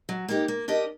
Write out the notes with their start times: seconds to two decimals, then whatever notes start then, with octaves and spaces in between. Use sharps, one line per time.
0.09 F#3
0.28 A#3 D#4 G4
0.48 A#3
0.68 D4 G4 A#4 D#5